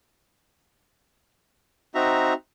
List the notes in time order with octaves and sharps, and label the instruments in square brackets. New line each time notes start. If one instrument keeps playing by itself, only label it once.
[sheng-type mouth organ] C4 D#4 F#4 E5 A#5